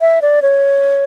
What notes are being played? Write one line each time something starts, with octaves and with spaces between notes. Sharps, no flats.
E5
D5
C#5